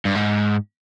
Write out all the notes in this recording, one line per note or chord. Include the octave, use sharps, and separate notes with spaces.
G2
G#2